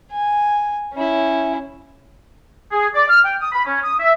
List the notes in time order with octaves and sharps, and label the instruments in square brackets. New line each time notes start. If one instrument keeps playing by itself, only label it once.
[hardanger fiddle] G#5
C#4 E4
[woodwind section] G#4
D5
F6
G5
D#6
B5
C#4
D#6
E5